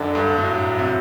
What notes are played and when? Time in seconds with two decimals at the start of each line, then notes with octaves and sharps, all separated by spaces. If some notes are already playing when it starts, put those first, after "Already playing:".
Already playing: F#2 D3
0.15 G2
0.38 A2 F#3
0.79 C3